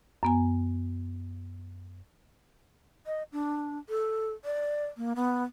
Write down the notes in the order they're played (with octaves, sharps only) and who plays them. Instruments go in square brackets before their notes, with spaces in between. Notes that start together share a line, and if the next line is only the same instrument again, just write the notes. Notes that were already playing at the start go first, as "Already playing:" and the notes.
[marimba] F#2 B3 G#5
[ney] D#5
D4
A4
D5
A#3
B3